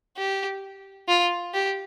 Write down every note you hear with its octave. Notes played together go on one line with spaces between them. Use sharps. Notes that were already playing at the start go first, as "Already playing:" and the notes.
G4
F4
G4